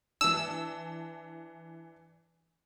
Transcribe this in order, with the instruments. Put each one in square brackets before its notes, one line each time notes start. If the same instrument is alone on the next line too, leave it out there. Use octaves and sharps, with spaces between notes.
[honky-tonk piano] E3 D4 [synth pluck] E6